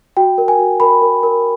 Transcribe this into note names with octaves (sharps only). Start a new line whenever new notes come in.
F#4 G5
A#4
G#5
F#4
A#4 B5
A#4
A#4